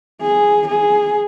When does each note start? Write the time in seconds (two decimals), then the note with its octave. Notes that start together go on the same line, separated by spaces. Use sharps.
0.22 G#4
0.68 G#4